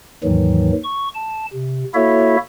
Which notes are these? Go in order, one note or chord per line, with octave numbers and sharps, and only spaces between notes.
D#2 G#2 D#3 E3 F#3
C#6
A5
C3
A#3 E4 F#4 A4 C#5 E5